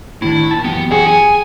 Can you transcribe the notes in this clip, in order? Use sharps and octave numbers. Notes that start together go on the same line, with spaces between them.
A2 D#3 D4 E4
A#2 A5
F#2 E3 B3 G4
F4 G#4 F#5
G#5